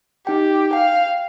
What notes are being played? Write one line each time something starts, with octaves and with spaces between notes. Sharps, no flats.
D#4 G4 G5
F5 G5